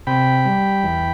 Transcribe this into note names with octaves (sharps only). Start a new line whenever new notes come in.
C3 G5 B5
G3
E2